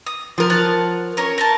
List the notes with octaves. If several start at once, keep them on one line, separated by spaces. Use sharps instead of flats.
D#6
F3 A#4
C#5 F#5 A5
C#4 A#4 C#5
A#4 C5 A5